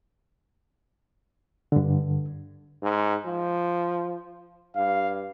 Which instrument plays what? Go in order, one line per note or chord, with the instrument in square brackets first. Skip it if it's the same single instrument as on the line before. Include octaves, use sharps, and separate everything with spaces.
[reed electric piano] G2 D3
[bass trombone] G#2
F3
[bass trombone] G2 [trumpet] F5